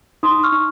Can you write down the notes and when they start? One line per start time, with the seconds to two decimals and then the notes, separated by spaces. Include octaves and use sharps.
0.23 D#4 C6 D#6
0.43 C#6 F6
0.52 D#4